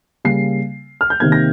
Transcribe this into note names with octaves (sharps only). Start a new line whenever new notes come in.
C#3 G3 A#3 C7
F6
G6
C3 D#3 A#3 G#6
A#6